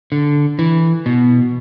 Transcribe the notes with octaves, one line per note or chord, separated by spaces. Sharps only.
D3
E3
B2